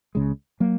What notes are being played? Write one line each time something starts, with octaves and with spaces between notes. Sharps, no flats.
C#2 C#3 G#3
F#3 A#3